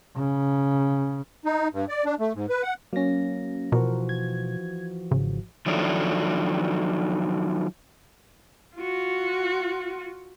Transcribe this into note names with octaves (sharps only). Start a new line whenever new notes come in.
C#3
D#4
G2
D5
D4
A3
G#2
B4
F#5
F#3 A#3 C#4 A#6
B2 E3 F3 F#4 A#4
G#6
G#1 C#3
D#3 F3 F#3 D4 E4 A4
F4 F#4